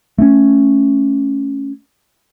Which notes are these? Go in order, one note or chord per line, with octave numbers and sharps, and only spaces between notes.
A3 C4 C#4